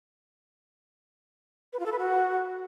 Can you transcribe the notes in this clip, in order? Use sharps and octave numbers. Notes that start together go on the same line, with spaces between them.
B4
F4
A4
B4
F#4